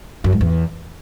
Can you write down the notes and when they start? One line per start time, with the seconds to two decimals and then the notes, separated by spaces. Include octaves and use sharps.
0.24 F#2
0.32 G#2
0.41 E2